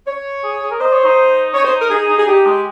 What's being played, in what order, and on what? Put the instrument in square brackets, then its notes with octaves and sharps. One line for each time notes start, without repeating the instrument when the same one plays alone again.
[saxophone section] C#5
[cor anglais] G#4
G#4
A#4
[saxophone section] C5 [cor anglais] D#5
[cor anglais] C#5
D#4
[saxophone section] C#5
C5
A#4
[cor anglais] D#4 [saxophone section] G#4
[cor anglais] D#4
[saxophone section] G#4
[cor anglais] D#4 [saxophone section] G4
[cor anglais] G#3